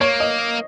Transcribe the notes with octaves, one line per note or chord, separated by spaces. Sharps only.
A#3 C#5
D#5